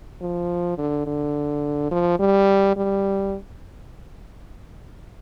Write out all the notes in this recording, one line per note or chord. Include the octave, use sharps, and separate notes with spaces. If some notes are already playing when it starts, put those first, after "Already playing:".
F3
D3
D3
F3
G3
G3